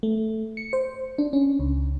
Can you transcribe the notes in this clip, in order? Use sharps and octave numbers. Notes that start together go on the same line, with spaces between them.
A3
C#7
C5
D4
C#4
C#2